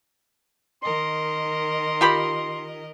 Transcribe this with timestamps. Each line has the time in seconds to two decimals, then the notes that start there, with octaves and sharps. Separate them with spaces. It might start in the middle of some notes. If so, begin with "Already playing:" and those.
0.83 D#3 A#4 D#5 C6
2.01 F4 G4 B5